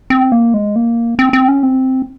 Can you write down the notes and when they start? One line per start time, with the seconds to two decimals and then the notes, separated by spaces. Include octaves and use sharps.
0.10 C4
0.32 A#3
0.54 G#3
0.76 A#3
1.19 C4
1.33 C4
1.48 C#4
1.63 C4